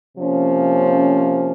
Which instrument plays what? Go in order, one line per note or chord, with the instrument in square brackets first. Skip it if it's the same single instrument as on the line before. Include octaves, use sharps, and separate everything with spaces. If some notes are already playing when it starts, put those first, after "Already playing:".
[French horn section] C3 F3 A#3 C#4